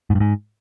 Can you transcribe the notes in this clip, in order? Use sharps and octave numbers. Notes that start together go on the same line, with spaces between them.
G#2
G2
G#2